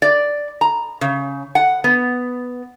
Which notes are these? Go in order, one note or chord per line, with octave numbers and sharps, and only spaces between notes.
D5
A#5
C#3
F#5
B3